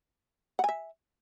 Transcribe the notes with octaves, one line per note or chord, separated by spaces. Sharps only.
E5 F#5 G#5